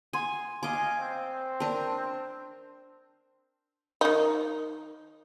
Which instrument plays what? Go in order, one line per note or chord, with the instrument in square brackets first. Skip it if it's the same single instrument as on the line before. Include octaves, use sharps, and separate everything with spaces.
[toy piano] F#5 C6 D#6 [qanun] G#5
[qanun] D#5 D6 [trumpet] F5 [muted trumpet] G#5
[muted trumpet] C4 [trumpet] C5
[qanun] D4 A#4 [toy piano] A5 E6
[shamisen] D#3 D#4